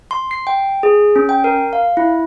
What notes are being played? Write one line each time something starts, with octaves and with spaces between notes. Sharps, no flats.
C6
C7
G5
G#4
C#4
G5
A#4
F5
E4